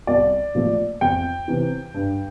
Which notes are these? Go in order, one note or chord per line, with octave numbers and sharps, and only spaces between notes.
C2 D5
A#2 F3 A3
F2 G5
C3 E3
G2